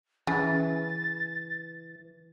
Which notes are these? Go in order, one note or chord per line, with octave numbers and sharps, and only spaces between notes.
C#3 E3 A6